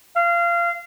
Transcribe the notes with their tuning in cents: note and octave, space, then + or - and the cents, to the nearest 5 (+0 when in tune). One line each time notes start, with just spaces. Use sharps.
F5 -25